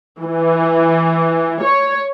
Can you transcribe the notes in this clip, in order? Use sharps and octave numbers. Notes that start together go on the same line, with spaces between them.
E3
C#5